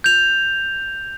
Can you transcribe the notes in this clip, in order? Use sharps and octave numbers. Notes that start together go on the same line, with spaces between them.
G6 F7